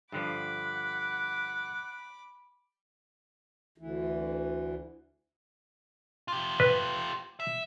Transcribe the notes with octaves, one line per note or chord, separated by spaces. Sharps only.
G2 D3 F3 F#5 B5 D6
D2 E3
F4 G4
B4
E5